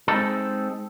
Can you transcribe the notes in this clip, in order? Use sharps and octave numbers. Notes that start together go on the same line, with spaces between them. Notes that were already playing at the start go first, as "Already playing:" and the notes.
G#3 C4 D#4 A4